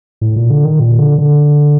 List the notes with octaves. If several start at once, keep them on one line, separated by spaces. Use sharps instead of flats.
A2
A#2
D3
D#3
A#2
D3
D3